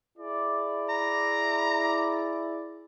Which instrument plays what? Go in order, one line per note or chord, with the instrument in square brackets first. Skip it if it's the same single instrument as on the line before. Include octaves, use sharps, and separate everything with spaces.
[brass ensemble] E4 G#4 D5
[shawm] A#5